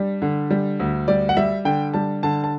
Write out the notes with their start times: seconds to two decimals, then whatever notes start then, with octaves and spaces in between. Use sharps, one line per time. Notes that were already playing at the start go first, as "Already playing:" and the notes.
Already playing: G3 D4
0.22 D3
0.50 G3
0.79 D2
1.08 G3 D5
1.29 F#5
1.37 G3 E5
1.65 D3 G5
1.93 G3 A5
2.23 D3 A5
2.44 A5